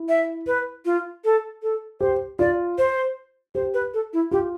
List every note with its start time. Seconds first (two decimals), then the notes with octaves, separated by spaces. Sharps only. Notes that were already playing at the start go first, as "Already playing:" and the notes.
Already playing: E4
0.09 E5
0.47 B4
0.86 F4
1.25 A4
1.63 A4
2.01 G4 C5
2.39 F4 D5
2.78 C5
3.55 G4 C5
3.74 B4
3.94 A4
4.13 E4
4.31 F4 G4